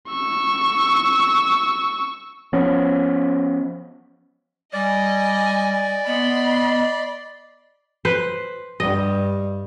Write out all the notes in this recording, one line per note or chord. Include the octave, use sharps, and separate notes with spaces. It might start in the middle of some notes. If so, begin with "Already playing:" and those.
C#6 E6
F3 B3 C#4
G3 D5 D#5 G#5
B3 D#5 B5 C6
B4 C5
G2 G3 D#5